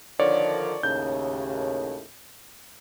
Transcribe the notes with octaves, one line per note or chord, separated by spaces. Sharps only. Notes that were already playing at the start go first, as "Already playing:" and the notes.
D3 D#3 F3 C#5 D5
D#2 A2 C#3 G6